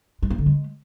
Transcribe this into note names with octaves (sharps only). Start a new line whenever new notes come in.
G#3
A#3
D3
G#3